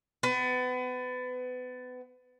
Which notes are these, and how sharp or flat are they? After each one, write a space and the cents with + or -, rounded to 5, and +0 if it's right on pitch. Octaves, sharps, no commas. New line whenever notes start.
B3 +30